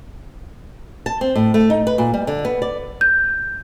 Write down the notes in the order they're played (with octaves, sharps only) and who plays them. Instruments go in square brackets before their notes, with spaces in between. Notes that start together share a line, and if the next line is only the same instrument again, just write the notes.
[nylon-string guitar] A5
C4
A2
A3
D#4
B4
A#2
G3
D3
B3
D5
[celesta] G6